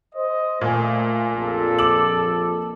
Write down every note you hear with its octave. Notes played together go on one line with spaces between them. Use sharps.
C5 D#5
A#2 A3 G#5
A#1 F2 A4
D6 E6 F#7